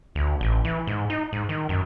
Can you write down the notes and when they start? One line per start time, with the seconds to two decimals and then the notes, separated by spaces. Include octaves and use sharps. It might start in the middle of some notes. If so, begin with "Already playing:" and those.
0.15 D2
0.41 A1
0.65 E3
0.87 G#2
1.10 D#4
1.33 G#2
1.49 D#3
1.69 F#2